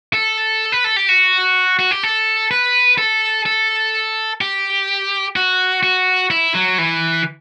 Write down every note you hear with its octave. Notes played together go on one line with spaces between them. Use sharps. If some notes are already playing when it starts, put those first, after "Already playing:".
A4
B4
A4
G4
F#4
F#4
G4
A4
B4
A4
A4
G4
F#4
F#4
E4
F#3
E3